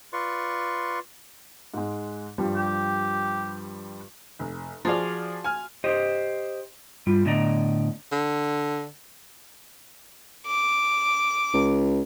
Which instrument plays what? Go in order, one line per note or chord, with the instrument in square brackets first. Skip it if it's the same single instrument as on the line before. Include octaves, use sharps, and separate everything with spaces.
[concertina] F4 B4 D5 C6 C#6
[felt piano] G#2 G#3
G2 F3 G3
[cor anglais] G4
[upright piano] F1
[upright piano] F3 G#4 D5 [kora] F4 F#4 F5
[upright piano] G#5 F6
[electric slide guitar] G4 C5 D#5
G2 G3 F4
A2 D3 B3 D5 D#5 A#5
[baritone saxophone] D3
[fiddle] D6
[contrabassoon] C#2